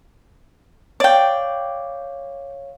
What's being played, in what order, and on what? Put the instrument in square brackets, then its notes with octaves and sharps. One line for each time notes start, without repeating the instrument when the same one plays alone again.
[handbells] C#5 F5 [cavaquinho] D5 G5